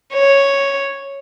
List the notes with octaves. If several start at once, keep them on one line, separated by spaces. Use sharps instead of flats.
C#5